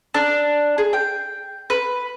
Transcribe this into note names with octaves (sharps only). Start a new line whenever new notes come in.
D4
G#4
G5
B4